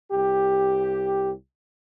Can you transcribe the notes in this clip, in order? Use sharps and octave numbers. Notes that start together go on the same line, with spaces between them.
C2 G4